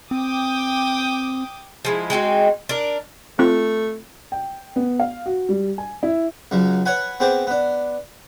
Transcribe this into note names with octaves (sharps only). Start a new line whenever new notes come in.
C4 G5 D6 D#6
F3 G#3 E4
G#3 C4 D#4 F#4
D4 A#4
A3 C4 F4 F#6
G5
B3
F5
F#4
G3
G#5
E4
C#2 F#2 F#3
B4 C#5 F#5 G#5 B5
B3 C4 G#4 C5 D6
B3 D4